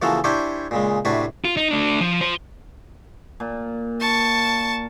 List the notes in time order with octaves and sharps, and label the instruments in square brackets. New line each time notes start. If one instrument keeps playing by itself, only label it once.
[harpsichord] C#3 E3 F3 A#3 F#4 A4
D4 E4 G4 C5 C#5 G#5
A#2 C#3 G#3
A2 C3 D4 F#4 B4 G#5
[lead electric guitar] F4
D#4
A3 D4
F3
F4 C5
[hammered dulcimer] A#2
[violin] A5 C#6